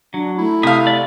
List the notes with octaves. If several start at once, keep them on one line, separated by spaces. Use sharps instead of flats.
F#3 D4
A3 E4
C3 E5 F5 D#6
B3 D5